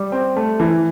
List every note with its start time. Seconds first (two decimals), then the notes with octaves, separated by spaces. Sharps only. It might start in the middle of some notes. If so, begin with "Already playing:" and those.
Already playing: G3
0.12 C4
0.36 A3
0.60 E3